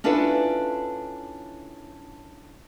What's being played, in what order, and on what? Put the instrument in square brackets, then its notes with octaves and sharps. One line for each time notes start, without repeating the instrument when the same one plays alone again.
[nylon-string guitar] C#4 D4 E4 F4 A4 B4